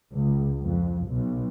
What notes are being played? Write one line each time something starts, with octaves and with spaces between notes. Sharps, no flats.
C#2
F2
B1